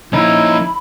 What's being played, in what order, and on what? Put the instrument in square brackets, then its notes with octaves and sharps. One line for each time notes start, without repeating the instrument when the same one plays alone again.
[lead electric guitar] F3 A#3 [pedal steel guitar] C#4 D#4 [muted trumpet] E4 [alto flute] B5